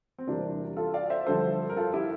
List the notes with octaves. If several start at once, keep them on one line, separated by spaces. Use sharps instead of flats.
C4
E2 C3 G3 A#3 D4
F4 A4
D5 F5
C5 E5
G2 D3 F3 A4 C5
A#4
F4 A4
E4 G4